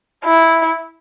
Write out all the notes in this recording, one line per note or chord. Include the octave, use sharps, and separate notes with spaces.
E4